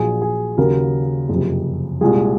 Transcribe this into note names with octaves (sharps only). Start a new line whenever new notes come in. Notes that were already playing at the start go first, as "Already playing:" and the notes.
Already playing: A#1 A#2 F#3 G#4
G#4
D#2 C#3 F#3 A#4
F#1 F2 C3
C2 A#2 G#3 G#4